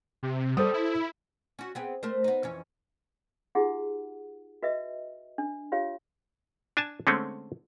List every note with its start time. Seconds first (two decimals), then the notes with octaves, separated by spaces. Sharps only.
0.23 C3
0.57 G3 A4 C5 D#6
0.74 E4
1.59 C#4 F#4
1.75 B3 C4 G#4
2.03 A3 A#4 C5
2.24 B3 D#4
2.43 F2 E3 C#4
3.55 D#4 F4 G4 G#4 F#5
4.63 F#4 B4 D#5 E5
5.38 D4
5.72 F4 G4 C#5 F5
6.77 D4 G#5 A5
7.07 D3 G#3 A3 C4 C#4